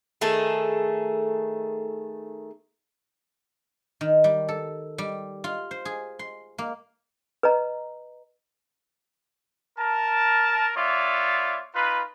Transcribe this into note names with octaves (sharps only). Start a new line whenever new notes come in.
D#3 A3 G#4 A4
D#3
G3
A4
G3
F4
C5
G#4
C6
A#3
B4 D#5 A#5
A#4 A5
B3 F4 C#5 D5 E5
D#4 F4 B4